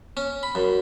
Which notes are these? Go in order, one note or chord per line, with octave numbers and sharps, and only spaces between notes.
C#4
B5
F#2